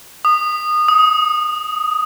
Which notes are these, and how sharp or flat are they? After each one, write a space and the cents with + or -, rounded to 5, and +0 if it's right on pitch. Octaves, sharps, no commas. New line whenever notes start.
D#6 -25
D#6 +15